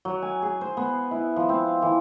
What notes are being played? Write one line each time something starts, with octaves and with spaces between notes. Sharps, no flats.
F#3
G#5
G#4
C5
B3
E4
F3
C4
E3